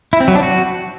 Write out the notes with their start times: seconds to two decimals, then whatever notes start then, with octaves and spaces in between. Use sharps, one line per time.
0.13 E4
0.20 C4
0.28 F#3
0.35 D4
0.43 F#4